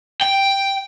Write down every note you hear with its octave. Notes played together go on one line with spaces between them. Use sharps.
G5